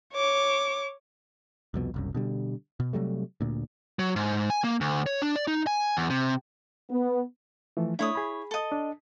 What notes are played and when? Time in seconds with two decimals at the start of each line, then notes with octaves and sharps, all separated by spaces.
0.14 C#5 D6
1.74 C2 F2 B2
1.94 F#1 C2 F#2
2.14 B2 D3 G3
2.80 B2
2.93 C3 F#3 G3 A3
3.41 D2 A#2
3.99 F#3
4.16 G#2
4.50 G#5
4.64 A#3
4.81 D2
5.06 C#5
5.22 D4
5.36 D5
5.47 D#4
5.67 G#5
5.97 E2
6.10 C3
6.91 B3
7.77 E3 F3 A3
7.99 A3 D4 E4 C#5 D#6
8.15 G#4 B5
8.51 A4 D#5
8.72 D4